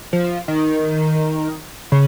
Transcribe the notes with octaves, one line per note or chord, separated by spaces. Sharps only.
F3
D#3
C#3